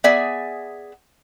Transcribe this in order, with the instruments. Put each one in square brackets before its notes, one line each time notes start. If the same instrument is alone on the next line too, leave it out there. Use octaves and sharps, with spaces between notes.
[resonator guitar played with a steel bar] B3 G#4 D5 E5 G#5